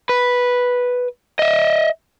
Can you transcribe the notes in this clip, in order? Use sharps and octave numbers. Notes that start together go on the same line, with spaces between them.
B4
D#5 E5